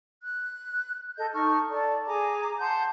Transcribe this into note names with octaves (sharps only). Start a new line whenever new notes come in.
F#6
A4 D#5 G6
D#4 A4 C#6 F6
A4 D5
G#4 G#5 A#5 D6
F#5 A5 C6 G6